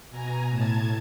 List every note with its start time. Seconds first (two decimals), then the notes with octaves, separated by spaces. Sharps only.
0.10 B2 G#5 A#5
0.50 A2 A5 G#6